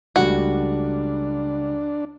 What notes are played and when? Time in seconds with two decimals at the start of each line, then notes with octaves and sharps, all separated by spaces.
0.16 C#2 G3 A3 D4 F#4